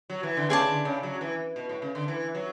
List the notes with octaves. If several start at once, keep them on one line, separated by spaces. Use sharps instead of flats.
F#3
E3
D3
C#3 G#4 D5 A5
D3
C#3
F#3
E3
B2
A2
C#3
D3
E3
F#3